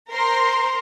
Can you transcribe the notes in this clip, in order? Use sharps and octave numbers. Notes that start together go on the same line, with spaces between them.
A#4 C5 A#5 C6